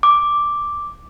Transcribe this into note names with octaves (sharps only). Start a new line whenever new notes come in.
D6